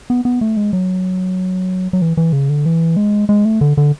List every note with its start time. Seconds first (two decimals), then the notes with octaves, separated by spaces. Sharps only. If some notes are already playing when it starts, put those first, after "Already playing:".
0.10 B3
0.25 B3
0.41 A3
0.57 G#3
0.73 F#3
1.93 F#3
2.02 E3
2.17 E3
2.33 C#3
2.49 D3
2.66 E3
2.97 G#3
3.29 G#3
3.45 A3
3.61 D3
3.77 D3